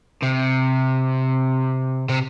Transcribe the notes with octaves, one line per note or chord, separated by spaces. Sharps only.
C3
C3